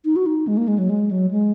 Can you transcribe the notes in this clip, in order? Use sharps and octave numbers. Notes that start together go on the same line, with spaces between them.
D#4
F#4
D#4
G#3
A#3
G#3
F#3
G#3
F#3
G#3